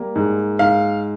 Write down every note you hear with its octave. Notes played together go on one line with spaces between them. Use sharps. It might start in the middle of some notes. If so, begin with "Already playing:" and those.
Already playing: G3 A#3
G#2
G#2 F5